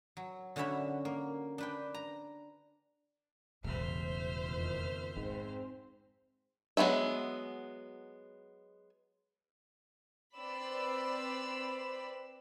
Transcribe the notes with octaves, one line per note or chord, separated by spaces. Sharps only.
F#3
D3 C#4 F#4 C#5 E5 B5
A#3
D4 B4 G5
A#5
E1 A1 C#3 A3 C5 E5 F6
F2 B2 D#3
G#2 G#3 C4
F#3 G#3 B3 F#4 E5
C4 B4 C5 D5 B5 E6